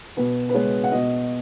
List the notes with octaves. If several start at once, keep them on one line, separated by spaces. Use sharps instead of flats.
B2 B4
B4
G#3 B3 C#5
F#5
B2 D#5